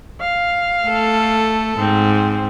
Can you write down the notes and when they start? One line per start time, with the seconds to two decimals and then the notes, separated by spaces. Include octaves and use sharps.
0.21 F5
0.85 A3 A4
1.79 G#2 C4